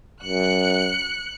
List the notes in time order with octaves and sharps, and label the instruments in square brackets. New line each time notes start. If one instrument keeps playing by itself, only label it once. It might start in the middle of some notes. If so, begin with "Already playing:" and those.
[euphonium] F#2 [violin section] F#6 C#7